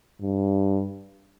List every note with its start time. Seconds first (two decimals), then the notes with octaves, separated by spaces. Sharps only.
0.22 G2